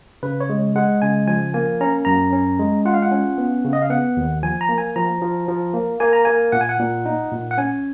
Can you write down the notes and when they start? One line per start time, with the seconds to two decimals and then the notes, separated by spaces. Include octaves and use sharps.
0.23 C#3 B4
0.40 C#5
0.50 G#3
0.75 G#3 F#5
1.02 C#3 G#5
1.28 F3 G#5
1.54 A#3 G#5
1.81 C#4 A#5
2.05 F#2 A#5
2.33 C#4
2.59 G#3
2.85 F4 F#5
2.94 F5
3.02 F#5
3.12 C#4
3.38 B3
3.65 C#3
3.73 D#5
3.82 F5
3.90 B3 F#5
4.17 D#2
4.43 F3 G#5
4.61 A#5
4.69 A#3
4.78 G#5
4.96 F3 A#5
5.21 F3
5.48 F3
5.74 A#3
6.00 A#3 G#5
6.13 A#5
6.25 A#3 G#5
6.52 A#2 F#5
6.61 G#5
6.69 F#5
6.79 A#2
7.06 D#4
7.32 A#2
7.51 F#5
7.58 C#4 G#5